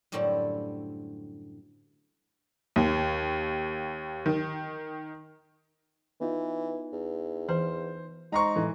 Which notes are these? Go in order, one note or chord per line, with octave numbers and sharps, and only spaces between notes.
F#2 A2 D3 G3 C4 E4
D#2
D#3
E3 B3 D#4 F4
E2
E3 C5
G#3 D#4 C5 A#5 C6 C#6
A2 E3 G#3 A4